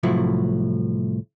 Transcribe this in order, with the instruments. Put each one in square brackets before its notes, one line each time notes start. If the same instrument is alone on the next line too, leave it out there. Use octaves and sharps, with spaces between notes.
[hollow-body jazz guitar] C2 A2 F3 F#3 E4